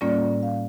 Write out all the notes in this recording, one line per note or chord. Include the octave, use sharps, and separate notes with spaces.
A2 G3 A#3 C#4 F4 D5
F5